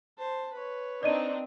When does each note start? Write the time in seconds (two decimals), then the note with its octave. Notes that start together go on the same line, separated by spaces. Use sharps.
0.18 C5 A5
0.53 B4 C#5
1.03 C4 D4 D#4 D5 D#5 D#7